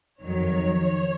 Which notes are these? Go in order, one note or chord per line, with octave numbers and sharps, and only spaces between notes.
F2 D#3 F#3 C#5